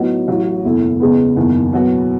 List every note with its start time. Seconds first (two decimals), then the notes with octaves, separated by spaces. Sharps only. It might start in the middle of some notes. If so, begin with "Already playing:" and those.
Already playing: A2 F#3 B3 D#4 F#4
0.28 A1 A2 F#3
0.64 F#1 E2 B2 A3 E4
1.00 E2 C#3 G#3 B3
1.36 F#1 E2 D#3
1.73 E2 B2 F#3 B3 F#4